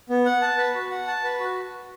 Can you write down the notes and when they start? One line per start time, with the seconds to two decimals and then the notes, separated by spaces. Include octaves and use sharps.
0.09 B3
0.25 F#5
0.42 A5
0.58 B4
0.75 F#4
0.91 F#5
1.07 A5
1.24 B4
1.40 F#4